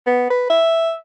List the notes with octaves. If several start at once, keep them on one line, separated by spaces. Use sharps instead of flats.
B3
B4
E5